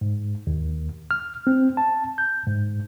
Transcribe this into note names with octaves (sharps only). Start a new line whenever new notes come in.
G#2
D#2
F6
C4
A5
G6
G#2